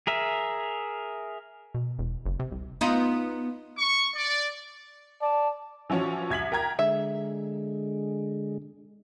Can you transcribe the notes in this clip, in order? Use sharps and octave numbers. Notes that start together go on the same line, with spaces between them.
G#4 A#4 E5
B2
E1
F#1
C3
C2
B3 D#4 F4
C#6
D5
D5 A5
E3 F3 C#4 F#4 C#5
C2 G#6 B6 F#7
A#4 G5 A#5 G#6
D3 G#3 E5